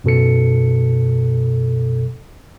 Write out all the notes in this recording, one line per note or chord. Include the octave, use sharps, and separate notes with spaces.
F#2 B2 A4 C#7